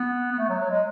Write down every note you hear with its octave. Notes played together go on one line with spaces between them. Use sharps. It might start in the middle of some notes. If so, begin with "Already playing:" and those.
Already playing: B3
B3
A3
F#3
F#3
G#3